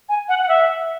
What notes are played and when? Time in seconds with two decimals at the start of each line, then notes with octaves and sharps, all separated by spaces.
0.09 G#5
0.29 F#5
0.42 F#5
0.49 E5